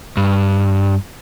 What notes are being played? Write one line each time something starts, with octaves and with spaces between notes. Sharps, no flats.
G2